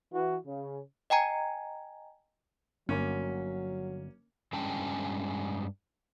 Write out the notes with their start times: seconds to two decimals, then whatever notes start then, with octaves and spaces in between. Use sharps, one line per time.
0.13 E3 F#4
0.45 C#3
1.10 D#5 G5 G#5 A#5 G#6
2.89 G1 F#3 A#3 C#4
4.53 G2 G#3 C#4 G5 A5